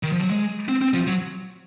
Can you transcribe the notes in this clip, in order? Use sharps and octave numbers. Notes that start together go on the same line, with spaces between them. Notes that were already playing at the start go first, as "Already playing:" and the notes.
D#3
F3
F#3
G#3
C4
C4
F3
F#3